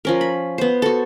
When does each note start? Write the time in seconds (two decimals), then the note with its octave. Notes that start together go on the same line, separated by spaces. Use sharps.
0.05 F3 C#4 A#4
0.21 B5
0.58 B3 C5
0.82 F#4 A4